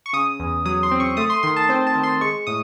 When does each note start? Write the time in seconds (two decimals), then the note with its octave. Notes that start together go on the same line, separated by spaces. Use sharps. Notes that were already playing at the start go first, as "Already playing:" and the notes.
0.06 C#6
0.13 C#3 D#6
0.40 E2
0.65 F#3 D#6
0.83 C6
0.91 C4
1.00 C#6
1.17 A3 D#6
1.30 C6
1.43 D#3 C6
1.56 A5
1.69 C4 C5
1.87 A5
1.95 D#3
2.03 C6
2.21 G#3 C#6
2.47 A2 D#6